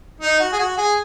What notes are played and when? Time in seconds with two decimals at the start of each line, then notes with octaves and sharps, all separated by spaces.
0.21 D#4
0.40 F#4
0.52 G#4
0.59 F#4
0.78 G#4